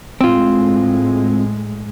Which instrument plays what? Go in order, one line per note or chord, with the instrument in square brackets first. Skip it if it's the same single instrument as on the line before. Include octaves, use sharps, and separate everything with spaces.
[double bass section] A2 G#3 [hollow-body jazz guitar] C4 F4